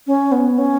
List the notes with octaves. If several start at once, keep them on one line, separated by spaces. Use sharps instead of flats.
C#4
B3
C#4